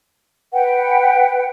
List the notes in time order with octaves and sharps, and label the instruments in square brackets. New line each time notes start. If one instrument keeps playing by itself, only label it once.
[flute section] B4 F#5 G5